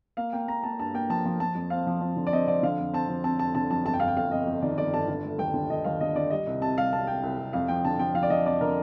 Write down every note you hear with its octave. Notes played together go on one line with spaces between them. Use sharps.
A#3 F5
A#3 G5
A#3 A#5
A#3 A5
G2 A5
A#3 G5
F3 A5
F3
F3 A5
F2
C4 F5
F3
F3
D3
D5
C4 D#5
F3 D5
D3 F5
F2
C4 A5
F3
C4 A5
F2 A5
D3 A5
F2 A5
G1 A5
G5
G1 F5
G5
G1 F5
F2 D#5
F2
D#3 D5
G1 D5
G1 A5
D3
A3
D#2 G5
D3
D3 D#5
D#2 F5
D3 D#5
D3 D5
G3 D#5
C2
C3 A5
G3 F5
C2 A5
C3 G5
C2
C2
F2 F5
F3 G5
D3 A5
F3 G5
F3 F5
D5
D3 D#5
F2 D5
D3 A#4